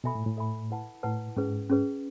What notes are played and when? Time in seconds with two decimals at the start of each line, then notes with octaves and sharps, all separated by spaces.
0.04 B2 A4 E5 G#5 B5
0.15 A2
0.26 A2
0.37 A4 E5 G#5 B5
0.71 E4 B4 F#5 A5
1.03 A2 E4 B4 F#5 A5
1.36 G#2 C#4 G#4 B4
1.70 C#4 G#4 B4